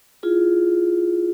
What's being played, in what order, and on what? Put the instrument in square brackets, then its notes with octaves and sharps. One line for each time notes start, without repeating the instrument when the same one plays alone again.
[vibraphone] E4 F4 G#4